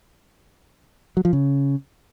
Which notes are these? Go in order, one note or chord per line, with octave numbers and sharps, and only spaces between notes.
F#3
F3
C#3